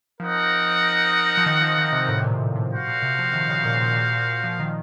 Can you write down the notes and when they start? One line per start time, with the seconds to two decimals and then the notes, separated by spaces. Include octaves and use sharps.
0.20 F3 C4 D#4 A#4 D#5 F#5
1.37 F3
1.46 D#3
1.61 F3
1.78 D#3
1.93 C3
2.09 A2
2.18 C3
2.24 A#2
2.56 C3
2.71 F#4 C5 F5
2.87 A#2
3.02 C3
3.19 F3
3.33 D#3
3.50 C#3
3.65 A#2
3.81 A#2
3.96 A#2
4.12 A#2
4.44 F3
4.60 D#3